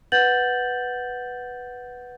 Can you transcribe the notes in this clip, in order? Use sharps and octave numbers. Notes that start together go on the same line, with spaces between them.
B4 F#5 G6 A6 F#7